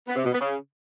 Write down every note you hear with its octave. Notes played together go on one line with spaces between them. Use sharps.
B3
C3
B2
B3
C#3